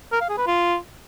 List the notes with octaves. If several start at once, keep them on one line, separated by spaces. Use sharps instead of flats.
A#4
F5
G#4
B4
F4